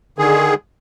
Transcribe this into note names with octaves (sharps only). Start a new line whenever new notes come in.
D3 D#3 G#4